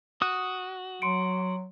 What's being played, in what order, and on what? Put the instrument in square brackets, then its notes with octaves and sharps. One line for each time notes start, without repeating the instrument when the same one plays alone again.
[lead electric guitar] F#4 [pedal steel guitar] D#6 [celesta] F#6
[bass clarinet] F#3 [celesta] C6 C#7 D7